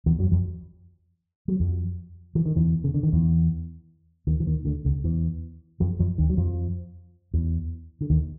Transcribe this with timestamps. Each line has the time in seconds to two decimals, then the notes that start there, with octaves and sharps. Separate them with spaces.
0.06 E2 E3
0.19 F#2 F#3
0.31 F2 F3
1.48 F#3
1.60 F2 F3
2.35 E3
2.46 D#3
2.56 E2 E3
2.84 C#3
2.94 D3
3.03 D#3
3.13 E2 E3
4.27 D#2 D#3
4.40 E3
4.46 D#2 D#3
4.65 D2 D3
4.85 C#2 C#3
5.04 E2 E3
5.80 F2 F3
5.99 F2 F3
6.18 D#2 D#3
6.30 F#3
6.37 F2 F3
7.34 E2 E3
8.01 D3
8.10 D#2 D#3